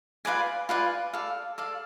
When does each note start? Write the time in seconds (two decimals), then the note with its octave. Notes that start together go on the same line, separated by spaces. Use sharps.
0.25 F4 B4 D5 G#5
0.69 F4 B4 D5 G#5
1.13 A4 D5 F5
1.58 A4 D5 F5